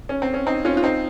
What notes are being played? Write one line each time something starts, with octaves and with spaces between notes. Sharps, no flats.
C#4
C4
C#4
C4 D#4
C#4 F4
F4
C4 D#4